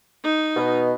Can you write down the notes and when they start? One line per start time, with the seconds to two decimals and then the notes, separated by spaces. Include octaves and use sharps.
0.23 D#4
0.57 B2